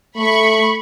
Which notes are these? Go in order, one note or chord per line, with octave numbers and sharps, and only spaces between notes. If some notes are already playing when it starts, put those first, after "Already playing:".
A3 B5 C#6